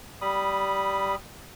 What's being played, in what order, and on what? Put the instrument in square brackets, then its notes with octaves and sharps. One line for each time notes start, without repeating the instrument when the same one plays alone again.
[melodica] G3 B5 D#6